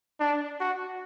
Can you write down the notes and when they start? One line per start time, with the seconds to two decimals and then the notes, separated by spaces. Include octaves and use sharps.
0.20 D4
0.60 F#4